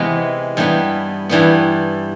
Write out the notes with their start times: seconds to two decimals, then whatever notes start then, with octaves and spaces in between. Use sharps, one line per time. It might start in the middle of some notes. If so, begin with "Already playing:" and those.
Already playing: C3 E3 G#3 B3
0.57 G2 E3 G3 B3
1.29 G2 E3 G3 B3